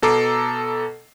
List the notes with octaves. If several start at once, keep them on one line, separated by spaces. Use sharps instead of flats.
B2 A4 A#5 D6 C7